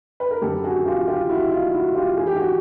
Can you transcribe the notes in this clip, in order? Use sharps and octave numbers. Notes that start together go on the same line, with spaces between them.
B4
A#4
F#2 D3 G4 A4
F#4 G#4
F4 G4
F4 G4
E4 F#4
D#4 F4
E4 F#4
F4 G4
G#2 E3 G#4
G4
F#4 G#4